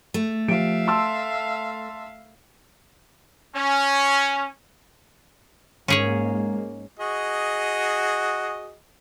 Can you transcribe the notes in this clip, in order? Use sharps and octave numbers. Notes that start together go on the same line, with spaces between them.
A3
F3 G4 E5 F5 D7
A5 C6 E6
C#4
G#2 G#3 A#3 C#4 G#4 C#5
F#4 G#4 D#5